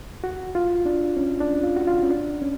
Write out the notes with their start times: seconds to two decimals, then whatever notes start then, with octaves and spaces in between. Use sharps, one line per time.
0.24 F#4
0.55 F4
0.86 D4
1.17 C#4
1.40 D4
1.63 F4
1.76 F#4
1.87 F4
2.03 C#4
2.10 D4
2.42 C#4